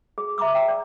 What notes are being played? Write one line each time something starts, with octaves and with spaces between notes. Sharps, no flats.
G#4
E5 A#5 C6 D6 E6
E5 G5 A#5
D5